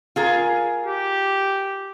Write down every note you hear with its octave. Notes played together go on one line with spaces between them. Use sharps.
F4 G#4 A#4
G4